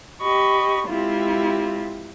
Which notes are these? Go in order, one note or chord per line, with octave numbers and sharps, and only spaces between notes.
G4 D#5 B5 C#6
G#3 C4 E4 F4 G4